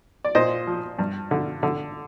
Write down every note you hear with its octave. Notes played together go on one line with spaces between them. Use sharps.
D5
A#2 C5 D#5
F3
G2
D3
D3